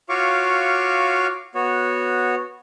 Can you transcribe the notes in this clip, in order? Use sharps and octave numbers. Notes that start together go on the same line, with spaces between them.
F4 F#4 C#5 F5 C#6 D6
B3 F#4 C#5